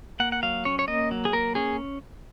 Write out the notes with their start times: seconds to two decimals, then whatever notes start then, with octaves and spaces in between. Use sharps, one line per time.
0.20 A#3 F#5
0.32 F#5
0.43 F#3 F5
0.65 C#4 C#5
0.79 C#5
0.88 A#3 D#5
1.11 F#3
1.25 G#4
1.33 A#3 A#4
1.55 C#4 G#4